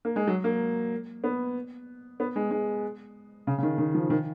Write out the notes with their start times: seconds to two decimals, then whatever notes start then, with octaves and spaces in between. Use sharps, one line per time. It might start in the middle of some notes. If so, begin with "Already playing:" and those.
0.05 A#3
0.16 G#3
0.27 F#3
0.44 A#3
1.24 B3
2.20 B3
2.36 G#3
2.51 G#3
3.47 C#3
3.58 C#3
3.63 D#3
3.78 D#3
3.95 F3
4.10 D#3